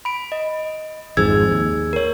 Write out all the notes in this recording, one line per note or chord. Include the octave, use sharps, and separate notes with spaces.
B5 D7
D#5
G#1 F2 G#2 G#4 E6 G#6
D#2
A#4 C#5